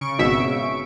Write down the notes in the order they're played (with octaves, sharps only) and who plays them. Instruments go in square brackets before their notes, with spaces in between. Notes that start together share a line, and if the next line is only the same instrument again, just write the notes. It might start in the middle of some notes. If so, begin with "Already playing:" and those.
[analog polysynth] C#3 C#6 D7
[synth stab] G#1 B2 E5